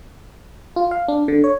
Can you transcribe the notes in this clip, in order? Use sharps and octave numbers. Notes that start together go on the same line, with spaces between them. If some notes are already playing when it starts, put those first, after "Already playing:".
F4
F5
D4
D3
C#5